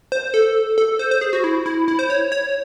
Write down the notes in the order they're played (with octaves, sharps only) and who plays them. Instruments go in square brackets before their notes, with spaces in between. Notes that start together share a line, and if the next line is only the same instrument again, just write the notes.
[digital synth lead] C5
A4
A4
C5
C5
G#4
F#4
E4
E4
E4
C5
C#5
C#5